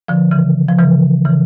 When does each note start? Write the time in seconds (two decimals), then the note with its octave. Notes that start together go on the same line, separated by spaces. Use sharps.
0.08 D3 F3
0.31 C#3 E3
0.69 F3
0.78 C#3 E3
1.25 C#3 E3